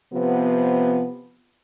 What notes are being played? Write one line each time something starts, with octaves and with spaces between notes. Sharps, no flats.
C3 F3 B3